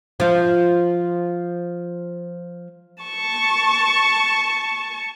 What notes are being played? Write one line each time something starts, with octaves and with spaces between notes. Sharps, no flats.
F3 F4
A5 C#6